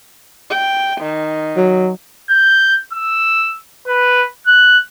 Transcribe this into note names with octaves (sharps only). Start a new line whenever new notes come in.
G5
D#3
F#3
G6
E6
B4
F#6